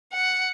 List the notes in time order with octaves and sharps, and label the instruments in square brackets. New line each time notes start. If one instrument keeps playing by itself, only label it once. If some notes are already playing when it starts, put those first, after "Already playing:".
[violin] F#5